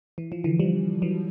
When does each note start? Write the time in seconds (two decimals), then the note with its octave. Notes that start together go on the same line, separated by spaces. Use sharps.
0.18 E3
0.32 F3
0.44 D3 E3
0.59 F3 G3
1.02 E3 F#3